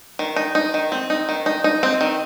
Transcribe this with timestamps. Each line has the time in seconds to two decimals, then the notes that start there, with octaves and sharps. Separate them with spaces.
0.19 D#3
0.36 D#4
0.55 D#4
0.74 D#3
0.92 C4
1.10 D#4
1.29 D#3
1.46 D#4
1.64 D#4
1.83 C4
2.01 D#3